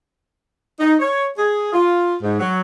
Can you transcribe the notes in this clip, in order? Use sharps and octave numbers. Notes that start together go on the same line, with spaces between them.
D#4
C#5
G#4
F4
G#2
F#3